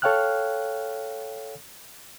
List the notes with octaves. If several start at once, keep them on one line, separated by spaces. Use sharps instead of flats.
A4 C#5 F5 G5 F6 F#6